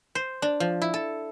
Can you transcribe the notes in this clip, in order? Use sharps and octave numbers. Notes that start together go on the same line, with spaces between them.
C5
D4
F3
E4
A4